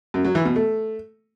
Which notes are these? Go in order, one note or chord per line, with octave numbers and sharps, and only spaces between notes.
F#2
F#3
E3
B2
A3